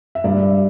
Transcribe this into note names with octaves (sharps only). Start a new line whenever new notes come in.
E5
G2 D5